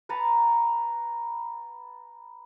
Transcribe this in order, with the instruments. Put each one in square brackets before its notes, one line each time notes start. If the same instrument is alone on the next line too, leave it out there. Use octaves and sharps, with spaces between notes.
[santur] B4 F#5 A5 A#5